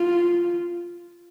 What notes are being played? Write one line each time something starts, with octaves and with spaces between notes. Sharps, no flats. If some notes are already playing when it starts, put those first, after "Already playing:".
Already playing: F4